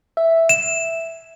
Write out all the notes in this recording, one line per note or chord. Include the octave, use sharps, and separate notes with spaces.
E5
E7